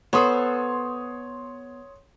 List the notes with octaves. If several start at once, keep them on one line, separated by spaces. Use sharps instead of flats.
B3 A4 C5 C#5 C6 D#6